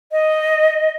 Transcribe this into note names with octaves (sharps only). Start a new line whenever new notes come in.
D#5